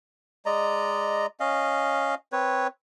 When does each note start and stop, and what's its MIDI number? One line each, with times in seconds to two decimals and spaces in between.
0.46 1.26 56
0.46 1.26 74
0.46 1.26 75
0.46 1.26 82
1.40 2.15 61
1.40 2.15 75
1.40 2.15 77
2.32 2.67 60
2.32 2.67 71
2.32 2.67 73